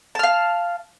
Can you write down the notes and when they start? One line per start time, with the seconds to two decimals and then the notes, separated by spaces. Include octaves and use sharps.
0.15 A5
0.19 F6
0.23 F5